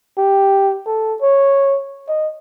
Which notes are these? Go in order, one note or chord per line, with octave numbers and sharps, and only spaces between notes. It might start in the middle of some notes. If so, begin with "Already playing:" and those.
G4
A4
C#5
D#5